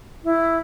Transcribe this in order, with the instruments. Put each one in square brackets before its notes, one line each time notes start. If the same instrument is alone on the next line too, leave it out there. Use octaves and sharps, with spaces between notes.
[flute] E4